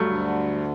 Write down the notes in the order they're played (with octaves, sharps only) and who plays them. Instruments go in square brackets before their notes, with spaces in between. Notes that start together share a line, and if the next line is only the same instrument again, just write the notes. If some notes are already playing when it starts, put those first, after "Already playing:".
Already playing: [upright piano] G2 F#3 A3
[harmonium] D2 D3